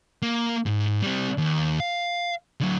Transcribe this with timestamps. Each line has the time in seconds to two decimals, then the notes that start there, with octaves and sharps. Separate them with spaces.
0.22 A#3
0.66 G#2
1.02 G3 C4
1.38 D#2
1.80 F5
2.60 D3 F#3